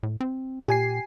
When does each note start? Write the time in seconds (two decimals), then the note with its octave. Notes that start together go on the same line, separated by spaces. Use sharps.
0.03 A2
0.21 C4
0.68 A#2 G4 G#5 C7